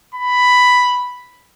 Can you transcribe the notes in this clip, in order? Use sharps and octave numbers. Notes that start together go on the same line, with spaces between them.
B5